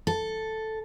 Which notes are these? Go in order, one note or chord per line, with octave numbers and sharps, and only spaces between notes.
A4